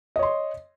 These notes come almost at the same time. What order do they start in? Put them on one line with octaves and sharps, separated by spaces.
D#5 C#5 C6